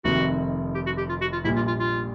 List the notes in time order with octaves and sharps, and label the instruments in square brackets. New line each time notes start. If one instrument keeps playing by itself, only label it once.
[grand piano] F1 F2 C3 D#3 [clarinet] F#4
[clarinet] G4
F#4
G4
F4
F#4
F4
[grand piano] A#1 A#2 G3 [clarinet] E4
[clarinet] F4
F4
F4